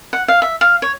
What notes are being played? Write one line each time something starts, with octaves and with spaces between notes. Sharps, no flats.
F#5
F5
E5
F5
C#5